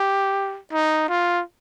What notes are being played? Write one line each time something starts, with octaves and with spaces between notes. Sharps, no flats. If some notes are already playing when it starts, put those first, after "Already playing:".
Already playing: G4
D#4
F4